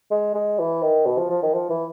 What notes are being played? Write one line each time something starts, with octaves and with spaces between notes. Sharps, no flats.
G#3
G#3
E3
D#3
B2
F3
F3
D#3
F3
E3